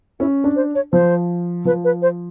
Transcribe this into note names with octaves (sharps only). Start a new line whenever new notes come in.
C#4 E4
D4
C5
C#5
F3 C5
F3 B4
B4
C5